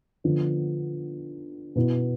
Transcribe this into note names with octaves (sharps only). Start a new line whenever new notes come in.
D3 F3 B3
B2 B3 E4